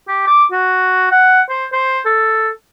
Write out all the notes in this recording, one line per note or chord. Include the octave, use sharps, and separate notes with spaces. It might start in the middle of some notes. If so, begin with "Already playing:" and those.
G4
D6
F#4
F#5
C5
C5
A4